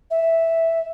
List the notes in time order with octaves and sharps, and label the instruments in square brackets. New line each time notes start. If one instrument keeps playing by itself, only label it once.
[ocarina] E5